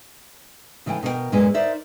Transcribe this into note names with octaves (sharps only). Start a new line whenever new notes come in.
C#3 E3 A3 G5
B2 A#4 C#5 G5
F#2 A#2 G#3 A#3 B4
D#4 A#4 C5 D5 E5